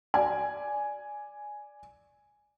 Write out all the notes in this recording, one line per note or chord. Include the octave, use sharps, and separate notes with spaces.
D5 G#5